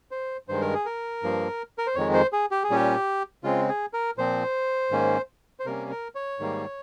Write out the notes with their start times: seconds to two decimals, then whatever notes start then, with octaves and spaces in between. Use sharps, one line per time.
0.11 C5
0.48 G2 D#3 G#3 C5
0.61 A#4
0.74 G#4
0.86 A#4
1.23 G2 F3 A#3
1.78 A#4
1.87 C5
1.95 F2 D#3 G#3 C#5
2.14 C5
2.33 G#4
2.51 G4
2.63 G#4
2.70 A#2 G3 C#4 G4
3.44 C#3 G#3 C4 F4
3.69 G#4
3.93 A#4
4.18 A#2 F3 C4 C5
4.91 G#2 D#3 A#3 C#4
5.60 C5
5.66 C3 G3 A#3 C#4 A#4
5.91 A#4
6.15 C#5
6.40 G#2 D#3 G3 A#3